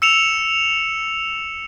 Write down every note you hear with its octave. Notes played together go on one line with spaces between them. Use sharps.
E6 C#7 E7 F7